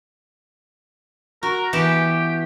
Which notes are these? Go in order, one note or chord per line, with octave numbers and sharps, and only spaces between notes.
F#4 A#4
E3 B3 G4 A5